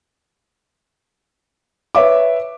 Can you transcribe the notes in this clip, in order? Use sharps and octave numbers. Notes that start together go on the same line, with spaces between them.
B4 C#5 E5 D6